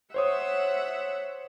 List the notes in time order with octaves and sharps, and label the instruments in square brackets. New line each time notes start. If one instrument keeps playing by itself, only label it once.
[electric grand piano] C5 C#5 D#6 [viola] E5 F#5